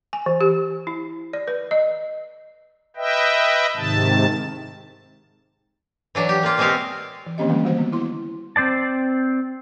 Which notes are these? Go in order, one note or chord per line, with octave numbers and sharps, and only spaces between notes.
G#5
E3
G4
E4
D5
B4
D#5
B4 D#5 E5 G5
G#2 C3 D#3 A5
E3 F#3 D4
G4
A#3 F4
B2 G#3 C4 F#4 G4 F5
E3
D#3 A#3 C4 C#4 G4 D#5
D3 E3 G3 G#3 A#3 C#4
G3 F#4 C5 F#5
B3
E4 C6
C4 C5 D5 A5